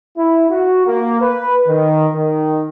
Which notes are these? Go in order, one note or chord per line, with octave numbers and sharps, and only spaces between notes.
E4
F#4
A#3
B4
D#3
D#3